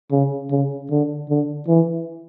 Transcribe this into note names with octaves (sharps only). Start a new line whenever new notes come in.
C#3
C#3
D3
D3
E3